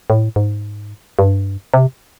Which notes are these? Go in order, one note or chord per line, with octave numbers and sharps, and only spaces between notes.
A2
G#2
G2
C3